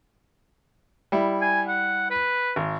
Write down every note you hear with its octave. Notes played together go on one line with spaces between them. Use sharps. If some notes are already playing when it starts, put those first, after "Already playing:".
G3 E4
G#5
F#5
B4
G#1